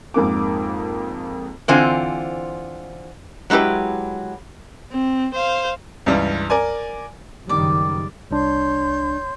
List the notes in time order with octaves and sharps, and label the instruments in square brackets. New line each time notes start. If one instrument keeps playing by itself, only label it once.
[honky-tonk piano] F2 G#2 A#3 D6
[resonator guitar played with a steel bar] D3 E3 C4 F4 C5 G#5
F#3 G#3 E4 G4 B4
[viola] C4
C5 F5
[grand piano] C#2 G2 E3 G3
A#4 D5 G#5
[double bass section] F#1 D#3 G3 [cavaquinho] D5 D6
[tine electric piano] C2 D4 [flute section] C#5 C6 G6